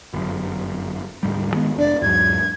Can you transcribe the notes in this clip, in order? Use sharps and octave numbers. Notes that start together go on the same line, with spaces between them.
G1 F#2
D2 G#2 G3
D#3 G#3 B3
F1 D4 D5
E2 G#2 F#3 G#6